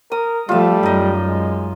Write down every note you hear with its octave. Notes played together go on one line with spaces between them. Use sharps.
A#4 D#6
F3 G3 A3 F4 E5
F#2 D#4 D#5
G#3